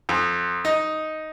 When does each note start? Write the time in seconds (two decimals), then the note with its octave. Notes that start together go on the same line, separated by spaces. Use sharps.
0.09 F2
0.65 D#4